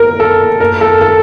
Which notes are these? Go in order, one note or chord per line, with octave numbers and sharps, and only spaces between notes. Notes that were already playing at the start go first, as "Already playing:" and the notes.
Already playing: A#4
A4
A#4
A4
A4